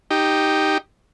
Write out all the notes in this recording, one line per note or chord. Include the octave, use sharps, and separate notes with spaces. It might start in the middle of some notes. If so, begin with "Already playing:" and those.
D#4 G4